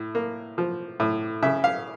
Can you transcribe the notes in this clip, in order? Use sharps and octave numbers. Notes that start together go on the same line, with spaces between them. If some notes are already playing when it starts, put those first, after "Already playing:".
Already playing: A2
A#3
F3
A2
C#3 E5
F5